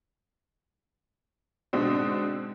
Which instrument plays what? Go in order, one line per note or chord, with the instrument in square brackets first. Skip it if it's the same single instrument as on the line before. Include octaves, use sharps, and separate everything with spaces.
[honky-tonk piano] G#2 B2 D3 C4 F#4